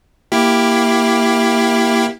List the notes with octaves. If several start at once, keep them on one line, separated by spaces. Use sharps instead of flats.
A#3 E4 G4